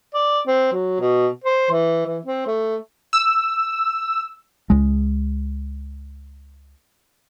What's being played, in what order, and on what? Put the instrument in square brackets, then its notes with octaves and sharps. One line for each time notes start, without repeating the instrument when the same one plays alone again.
[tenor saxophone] D5
C4
F#3
B2
C5
E3
E3
C4
A3
[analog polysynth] E6
[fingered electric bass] C#2 G#3